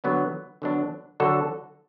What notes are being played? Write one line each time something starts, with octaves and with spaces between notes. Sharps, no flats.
D3 F#3 B3 D4
D3 F#3 B3 D4
D3 F#3 D4 F#4 A4